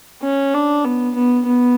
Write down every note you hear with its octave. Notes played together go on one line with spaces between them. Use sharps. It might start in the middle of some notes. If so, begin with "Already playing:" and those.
C#4
D4
B3
B3
B3